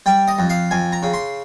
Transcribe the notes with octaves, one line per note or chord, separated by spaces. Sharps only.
G3 G5
D#5
F2
F5
F2 G#5
A#5
C#3
C6